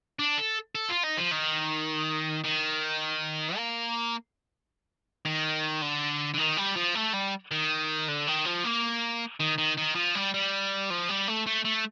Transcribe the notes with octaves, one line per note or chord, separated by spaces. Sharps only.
D4
A4
A4
F4
D#4
F3
D#3
D#3
A#3
D#3
D3
D3
D#3
G3
F3
A3
G3
D#3
D3
D#3
F3
A#3
D#3
D#3
D#3
F3
G3
G3
F3
G3
A3
A3
A3